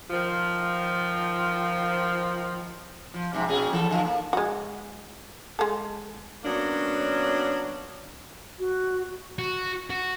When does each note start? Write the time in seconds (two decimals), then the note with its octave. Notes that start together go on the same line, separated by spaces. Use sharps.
0.10 D#3 F3
3.14 F3
3.33 F2 G#2 C3
3.48 A#2 C#4 G#4
3.73 E3 A4
3.91 D3 F3
4.05 A#3
4.33 G#3 F#4
5.59 G#3 A4
6.44 F#3 A#3 B3 C#4 D4
8.59 F#4
9.39 F#4
9.90 F#4